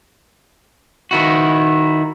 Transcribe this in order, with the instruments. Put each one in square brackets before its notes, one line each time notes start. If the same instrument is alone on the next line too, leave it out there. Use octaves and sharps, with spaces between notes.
[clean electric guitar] D#3 E4 F#4